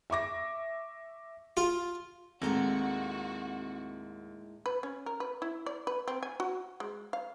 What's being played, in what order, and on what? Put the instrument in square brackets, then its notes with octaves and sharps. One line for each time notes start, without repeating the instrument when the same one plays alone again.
[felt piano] E5 C#6 D6 A#6
[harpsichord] F4
[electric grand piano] D#2 [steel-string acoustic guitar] A2 G#3 D#4 [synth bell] C4 A4 A#5 [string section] F#4
[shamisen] B4
C#4
A#4
B4
E4
D5
B4
C4
G#5
F#4
G#3
F5